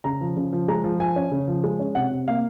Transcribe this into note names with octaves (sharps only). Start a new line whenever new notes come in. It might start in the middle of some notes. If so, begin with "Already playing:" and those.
C#3 A#5
F3
C#3
F3
G#3 A#5
F3
F3 G#5
C#4
C#3
F3
G#3
C#4
C3 F#5
C3
A#3 F5